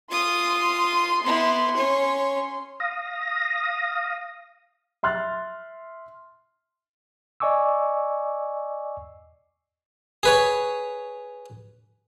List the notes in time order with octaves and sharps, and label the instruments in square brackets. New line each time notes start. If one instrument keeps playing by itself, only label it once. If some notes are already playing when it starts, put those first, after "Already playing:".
[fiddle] F4 D#6 [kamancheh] C6
[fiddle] B3 E4
C#4 C#5
[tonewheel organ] F5 D#6 A#6
[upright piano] E5 C6 F6 F#6 A6
[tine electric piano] D5 D#5 G#5 C#6 D6 E6
[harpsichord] G#4 B4 C#5